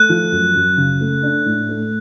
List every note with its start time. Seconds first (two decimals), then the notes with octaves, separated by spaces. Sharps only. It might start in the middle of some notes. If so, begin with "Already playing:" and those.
Already playing: A3 F#6
0.09 F3
0.32 F#2
0.55 F#2
0.77 C#3
1.00 A3
1.23 D4
1.46 A2
1.69 A3